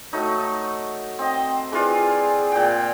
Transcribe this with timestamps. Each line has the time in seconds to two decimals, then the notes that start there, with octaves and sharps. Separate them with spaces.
0.13 F#3 A3 D#4
1.19 C4 D#5
1.73 E3 F4 G#4 D5
2.52 A#2 G5